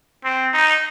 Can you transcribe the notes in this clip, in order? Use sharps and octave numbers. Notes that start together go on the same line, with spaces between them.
C4
D#4